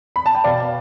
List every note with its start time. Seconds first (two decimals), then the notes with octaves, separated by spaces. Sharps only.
0.16 B5
0.26 A5
0.35 G5
0.44 B2 D5 F5